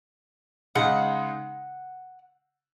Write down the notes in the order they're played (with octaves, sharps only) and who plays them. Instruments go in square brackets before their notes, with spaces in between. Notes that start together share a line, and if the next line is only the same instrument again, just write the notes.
[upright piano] C#3 G#3 D#4 [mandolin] F#5